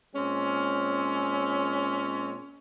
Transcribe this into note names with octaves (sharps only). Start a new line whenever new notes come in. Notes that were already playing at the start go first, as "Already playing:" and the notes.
A#2 G#3 C4 C#4